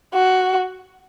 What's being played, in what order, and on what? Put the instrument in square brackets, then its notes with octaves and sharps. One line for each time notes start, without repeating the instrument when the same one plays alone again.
[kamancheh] F#4